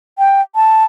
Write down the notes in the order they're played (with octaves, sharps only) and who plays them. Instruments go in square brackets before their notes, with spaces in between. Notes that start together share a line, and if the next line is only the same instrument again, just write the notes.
[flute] G5
A5